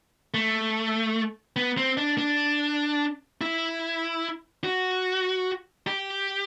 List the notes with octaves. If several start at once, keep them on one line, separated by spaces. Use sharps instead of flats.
A3
B3
C4
D4
D4
E4
F#4
G4